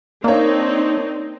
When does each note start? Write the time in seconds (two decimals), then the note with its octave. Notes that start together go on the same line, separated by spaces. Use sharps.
0.24 A#3 C4 D4 D#4 C#5